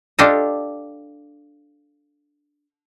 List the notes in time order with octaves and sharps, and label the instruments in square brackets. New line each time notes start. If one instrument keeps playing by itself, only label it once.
[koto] D4 F4 G4 A4 D#5